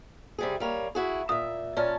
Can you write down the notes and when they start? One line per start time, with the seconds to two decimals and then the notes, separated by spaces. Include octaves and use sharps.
0.38 C3 G3 G#4
0.60 G3 A#3 C#5
0.95 E4 F#4 G#4
1.29 A#2 E5 D#6
1.77 A#2 C#4 C#5 D5 A5 F6